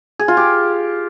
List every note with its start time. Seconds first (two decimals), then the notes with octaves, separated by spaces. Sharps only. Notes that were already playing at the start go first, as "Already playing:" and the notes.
0.19 G#4
0.28 F4
0.37 G4